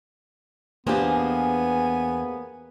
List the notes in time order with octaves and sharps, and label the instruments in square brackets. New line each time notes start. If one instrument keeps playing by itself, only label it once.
[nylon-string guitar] E2 D4 G4 [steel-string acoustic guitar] A#3 G#4 C5 [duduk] B3 [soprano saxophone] G#5